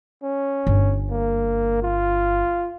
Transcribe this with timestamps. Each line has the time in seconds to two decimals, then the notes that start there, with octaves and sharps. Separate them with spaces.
0.23 C#4
0.67 G1
1.10 A#3
1.83 F4